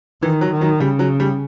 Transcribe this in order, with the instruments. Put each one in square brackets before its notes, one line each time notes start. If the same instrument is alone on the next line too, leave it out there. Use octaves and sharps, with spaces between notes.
[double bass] D#3 [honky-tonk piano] E3
[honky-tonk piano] F#3
[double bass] D#3
[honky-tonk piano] F#3
[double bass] C#3 [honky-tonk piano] G3
[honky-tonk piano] F#3
G3